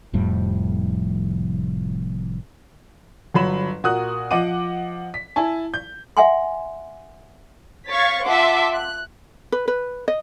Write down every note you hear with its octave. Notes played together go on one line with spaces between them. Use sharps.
F1 F2 A2 G3
G1 F#3 B5 E7
A#2 F#4 A#4 D#6 F#6
F3 D#5 F#5 D6 D#7
B6
E4 G#5 A5
G6
E5 F#5 G#5 C6
C#5 F5 C#6 G#6 A6 B6
F4 E5 F#5 A5 C6 D6
F#6
B4
B4
D#5